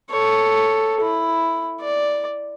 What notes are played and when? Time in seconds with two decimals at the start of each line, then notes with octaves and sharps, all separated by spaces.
0.10 A4 C#5
1.01 E4
1.81 D5